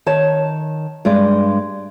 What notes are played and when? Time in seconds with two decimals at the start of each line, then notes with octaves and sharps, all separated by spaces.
0.06 D#3 C#5 A5
1.05 G2 G#3 D5